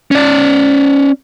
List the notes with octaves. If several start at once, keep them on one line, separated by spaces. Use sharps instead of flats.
C#4 D5